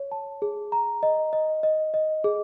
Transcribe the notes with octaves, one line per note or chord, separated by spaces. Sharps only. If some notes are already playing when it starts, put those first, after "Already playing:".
Already playing: C#5
A5
G#4
A#5
D#5
D#5
D#5
D#5
G#4